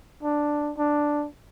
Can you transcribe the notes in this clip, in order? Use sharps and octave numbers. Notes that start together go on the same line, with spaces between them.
D4
D4